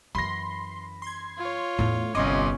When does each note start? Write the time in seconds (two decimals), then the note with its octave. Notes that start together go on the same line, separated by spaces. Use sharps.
0.15 F#2 E3 B5 C6 A#6
1.02 C6 G#6
1.38 F4 C#5
1.78 E2 A2 D4
2.15 G1 C2 C#4 D#5 C6 D6